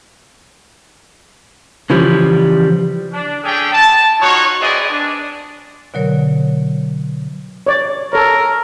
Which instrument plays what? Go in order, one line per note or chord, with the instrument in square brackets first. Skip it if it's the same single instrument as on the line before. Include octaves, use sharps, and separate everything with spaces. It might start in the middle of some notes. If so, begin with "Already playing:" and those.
[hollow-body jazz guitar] C#3 E3 F3 G3
[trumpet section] D4
A3 C#4 D4 G#4 G5
A5
D#4 F4 F#4 C#5
C4 G#4 B4 D5 D#5
D4
[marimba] B2 D3 F#3 A#4 C#5
[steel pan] C#5 D5
[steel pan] A4 C#5 [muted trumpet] A#4